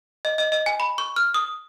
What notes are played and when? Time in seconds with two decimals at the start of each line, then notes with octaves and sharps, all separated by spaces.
0.25 D#5
0.38 D#5
0.52 D#5
0.66 G#5
0.80 B5
0.98 C#6
1.16 F6
1.34 D#6